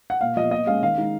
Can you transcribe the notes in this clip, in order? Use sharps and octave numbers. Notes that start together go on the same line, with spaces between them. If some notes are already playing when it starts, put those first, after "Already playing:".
F#5
A#2 F5
F3 B3 D#5
A#2 D#5
G#3 C#4 F5
D#3 F5
G#3 D#4